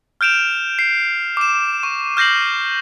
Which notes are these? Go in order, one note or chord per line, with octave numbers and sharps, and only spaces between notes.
F6 G6 D7 E7 F7
C7
D6 E7
C#6
F6 G6 A#6 C7 F#7